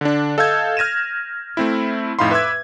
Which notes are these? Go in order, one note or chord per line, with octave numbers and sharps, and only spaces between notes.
D3 D4
A4 D#5 F5 E6 G6 G#6
F6 G#6 A#6 D#7 E7
A3 C4 E4
F2 A2 D#4 F5 B5 C6
B4 E5 D6 E6 G#6